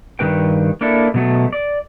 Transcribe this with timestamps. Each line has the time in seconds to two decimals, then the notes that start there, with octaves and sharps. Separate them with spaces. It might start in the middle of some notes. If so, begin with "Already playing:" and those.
0.19 G2 D#3 E3 D4 B4 G5
0.81 A#3 D4 E4 A4
1.14 B2 F#3 A3
1.53 D5